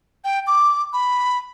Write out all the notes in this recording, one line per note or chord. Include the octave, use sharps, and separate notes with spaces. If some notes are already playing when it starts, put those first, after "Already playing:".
G5
D6
B5